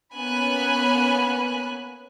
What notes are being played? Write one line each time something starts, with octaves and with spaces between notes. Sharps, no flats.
A#3 B3 C#4 G#5 B5 F#6